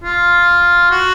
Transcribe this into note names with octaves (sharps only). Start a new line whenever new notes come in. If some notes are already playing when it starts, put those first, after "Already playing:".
F4
F#4